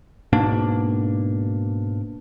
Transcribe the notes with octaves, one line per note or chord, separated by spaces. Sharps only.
G#2 B2 A#3 D4